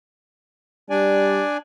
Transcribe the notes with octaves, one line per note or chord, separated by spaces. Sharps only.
G3 D4 D5 G#5